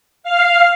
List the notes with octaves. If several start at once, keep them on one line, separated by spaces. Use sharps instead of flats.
F5